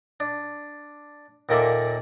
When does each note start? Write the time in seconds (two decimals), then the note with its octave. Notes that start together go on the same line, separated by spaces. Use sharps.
0.20 D4
1.49 D#2 A#2 A#3 A4 D5 E5